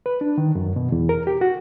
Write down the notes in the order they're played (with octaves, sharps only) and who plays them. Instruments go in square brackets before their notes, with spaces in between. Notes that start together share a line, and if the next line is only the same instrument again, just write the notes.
[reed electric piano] B4
D4
D#3
F#2
B2
E2
A#4
G4
F#4